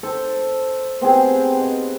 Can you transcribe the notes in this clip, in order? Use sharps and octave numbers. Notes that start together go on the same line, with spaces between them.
A4 C5
B3 C4 G4 G#4
B4 D#5